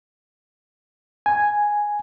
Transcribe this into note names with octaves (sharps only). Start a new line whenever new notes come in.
G#5